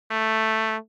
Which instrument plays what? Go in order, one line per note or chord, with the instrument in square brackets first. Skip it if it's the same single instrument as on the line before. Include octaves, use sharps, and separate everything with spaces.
[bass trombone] A3